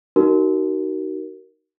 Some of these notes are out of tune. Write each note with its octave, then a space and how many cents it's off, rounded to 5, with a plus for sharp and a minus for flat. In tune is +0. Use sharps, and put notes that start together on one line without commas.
D#4 +0 F#4 +35 A#4 +0